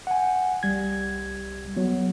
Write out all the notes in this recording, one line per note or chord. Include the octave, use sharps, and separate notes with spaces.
F#5 G#5
C2 G3 G#6
F#3 B3